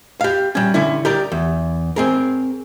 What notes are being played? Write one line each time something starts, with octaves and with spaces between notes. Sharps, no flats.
G4 F5
G3 C#4
D3 C#4 E4
G4 A#4 D5
E2
C4 G#4 A#4